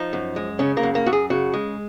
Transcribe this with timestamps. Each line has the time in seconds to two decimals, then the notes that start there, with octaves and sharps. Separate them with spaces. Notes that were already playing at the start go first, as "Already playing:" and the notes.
Already playing: F3 D#4
0.13 F#2
0.36 G#3
0.59 C#3 C#4
0.77 A#3
0.83 F#2
0.95 A#3
1.06 F#2 F#4
1.13 G#4
1.30 C#3 F#4
1.53 G#3